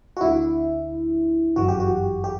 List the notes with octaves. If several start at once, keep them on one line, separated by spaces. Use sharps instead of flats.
F#4
D2 D3 E4
G1 F#2 E3 F#4
G4
F#4
G4